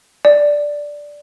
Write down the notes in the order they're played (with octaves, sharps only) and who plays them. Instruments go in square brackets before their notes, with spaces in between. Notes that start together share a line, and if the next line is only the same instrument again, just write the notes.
[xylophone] D5